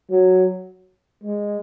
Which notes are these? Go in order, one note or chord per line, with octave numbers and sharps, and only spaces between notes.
F#3
G#3